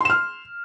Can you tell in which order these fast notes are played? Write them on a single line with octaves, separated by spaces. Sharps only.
C6 E7 F6